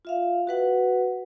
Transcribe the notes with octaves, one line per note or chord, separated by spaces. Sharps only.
F4 E5 F5
F#4 B4 F#5